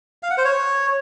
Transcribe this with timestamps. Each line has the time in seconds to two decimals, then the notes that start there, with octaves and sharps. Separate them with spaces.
0.23 F5
0.30 F#5
0.38 C5
0.45 C#5